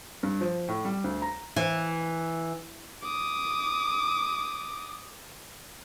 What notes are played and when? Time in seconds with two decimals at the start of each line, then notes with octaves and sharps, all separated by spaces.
0.23 G2
0.41 F3
0.69 A2
0.85 G3
1.04 D2
1.22 A#5
1.56 E3
3.03 D6 D#6